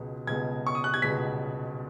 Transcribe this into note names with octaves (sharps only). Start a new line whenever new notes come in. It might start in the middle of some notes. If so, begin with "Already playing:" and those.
Already playing: C#2 B2 G#3
C#2 B2 G#3 G#6
C#6
D#6
F#6
G#6
C#2 B2 G#3 B6